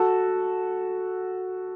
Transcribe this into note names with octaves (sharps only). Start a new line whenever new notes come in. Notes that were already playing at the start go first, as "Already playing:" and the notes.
Already playing: F#4 A4